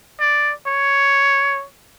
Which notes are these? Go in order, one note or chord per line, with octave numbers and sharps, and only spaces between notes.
D5
C#5